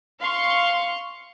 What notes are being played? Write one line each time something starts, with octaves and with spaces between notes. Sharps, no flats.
F5 C6 C#6